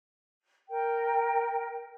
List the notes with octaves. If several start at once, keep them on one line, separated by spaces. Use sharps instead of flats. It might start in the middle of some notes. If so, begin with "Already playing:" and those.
A#4 G5